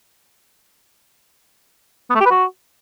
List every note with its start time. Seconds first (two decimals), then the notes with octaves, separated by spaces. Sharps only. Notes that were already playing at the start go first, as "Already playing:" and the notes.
2.10 B3
2.15 A3
2.20 G4
2.25 B4
2.31 F#4